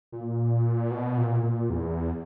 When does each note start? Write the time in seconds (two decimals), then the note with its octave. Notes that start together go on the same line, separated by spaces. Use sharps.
0.12 A#2
0.91 B2
1.17 A#2
1.43 A#2
1.70 E2